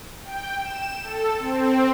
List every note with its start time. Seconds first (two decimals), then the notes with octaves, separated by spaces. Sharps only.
0.24 G5
0.61 E7
1.03 A4
1.39 C4